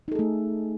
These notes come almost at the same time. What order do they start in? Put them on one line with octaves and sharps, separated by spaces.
D#4 A4 G#4 A3